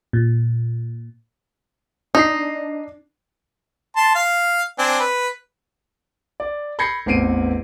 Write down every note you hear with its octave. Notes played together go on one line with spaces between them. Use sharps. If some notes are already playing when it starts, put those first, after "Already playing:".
A#2
D4 D#4 C7
A5 C6
F5
C4 D4 G#5
B4
D5
B5 G6 G#6 A#6 C7 C#7
A1 E2 C4 C7 D7 D#7